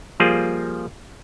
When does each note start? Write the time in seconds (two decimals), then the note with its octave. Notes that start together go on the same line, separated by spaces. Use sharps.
0.20 F3 G3 A#3 F4 G#4